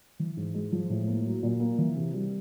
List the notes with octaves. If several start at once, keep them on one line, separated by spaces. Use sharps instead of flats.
E3
G#2
G#3
F3
A2
A#3
F#3
A#2
A#3
E3
C3
G3